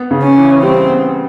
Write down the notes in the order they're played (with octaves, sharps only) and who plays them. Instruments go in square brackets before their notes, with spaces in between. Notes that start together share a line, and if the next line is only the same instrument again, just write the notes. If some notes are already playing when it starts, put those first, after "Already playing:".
Already playing: [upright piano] B3
C#3
[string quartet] C#4
[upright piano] E3
[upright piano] G3 [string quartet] C4
[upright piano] B3